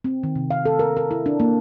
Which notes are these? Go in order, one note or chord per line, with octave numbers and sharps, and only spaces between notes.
C4
D#3
C3
F5
A4
A#4
A#4
E4
D4
A#3